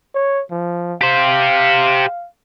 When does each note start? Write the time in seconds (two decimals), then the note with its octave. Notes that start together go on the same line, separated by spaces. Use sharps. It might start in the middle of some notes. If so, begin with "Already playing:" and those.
0.15 C#5
0.51 F3
1.01 G4 C5 F5